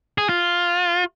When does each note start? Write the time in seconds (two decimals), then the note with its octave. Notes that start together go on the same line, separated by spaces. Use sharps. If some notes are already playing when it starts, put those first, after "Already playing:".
0.18 G#4
0.29 F4